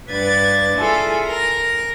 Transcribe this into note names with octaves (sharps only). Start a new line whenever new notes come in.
G2 B4 D5 G#6 A6
E4 F4 G#4 A4
A#4 A#6